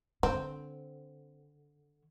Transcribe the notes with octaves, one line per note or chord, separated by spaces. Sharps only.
D3 C4